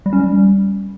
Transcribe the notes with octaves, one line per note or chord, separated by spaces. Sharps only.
G3
C#4
G3